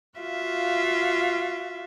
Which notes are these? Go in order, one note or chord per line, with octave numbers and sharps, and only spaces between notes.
F4 F#4 E5 F5